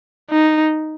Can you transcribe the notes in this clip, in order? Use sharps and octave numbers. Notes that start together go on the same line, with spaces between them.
D#4